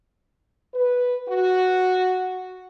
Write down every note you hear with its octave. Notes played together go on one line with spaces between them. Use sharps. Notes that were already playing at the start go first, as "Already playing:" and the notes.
B4
F#4